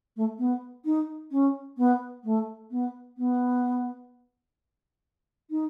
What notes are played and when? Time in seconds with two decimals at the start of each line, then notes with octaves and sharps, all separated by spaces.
0.16 A3
0.38 B3
0.85 D#4
1.31 C#4
1.77 B3
2.24 A3
2.71 B3
3.17 B3
5.50 D#4